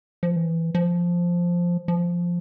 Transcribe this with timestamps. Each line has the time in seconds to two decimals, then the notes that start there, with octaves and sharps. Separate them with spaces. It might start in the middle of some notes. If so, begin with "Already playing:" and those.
0.23 F3
0.36 E3
0.75 F3
1.88 F3